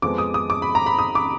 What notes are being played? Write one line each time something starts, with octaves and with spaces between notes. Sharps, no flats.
F2 F3 G#3 B3 D6
D#6
D#6
D6
B5
A#5
B5
D#6
D6